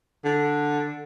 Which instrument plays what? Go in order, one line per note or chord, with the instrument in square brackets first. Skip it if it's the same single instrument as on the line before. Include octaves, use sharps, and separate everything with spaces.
[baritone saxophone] D3